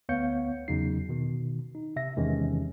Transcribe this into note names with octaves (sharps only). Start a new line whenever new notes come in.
D2 B3 C#5 F5 G6 C#7
E2 C#3 F#3 D#4 C7
B2 D#3
D#4
C3 E5 A#6
E2 C3 D#3 E3 G#3 C#4